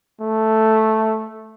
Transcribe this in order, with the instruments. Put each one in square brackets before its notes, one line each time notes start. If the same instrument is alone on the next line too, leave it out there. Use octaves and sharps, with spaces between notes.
[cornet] A3